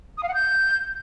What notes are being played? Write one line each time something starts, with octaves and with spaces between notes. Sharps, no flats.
D#6
F5
F#5
G6